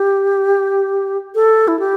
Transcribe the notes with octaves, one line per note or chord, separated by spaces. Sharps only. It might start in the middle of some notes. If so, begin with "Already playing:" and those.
Already playing: G4
A4
E4
G4